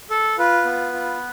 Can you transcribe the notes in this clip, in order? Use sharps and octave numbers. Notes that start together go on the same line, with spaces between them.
A4
F4 B4
B3
F4